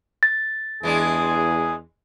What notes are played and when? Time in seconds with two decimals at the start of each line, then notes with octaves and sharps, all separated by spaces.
0.23 A6
0.83 E2 E3 G#3 D4 G#4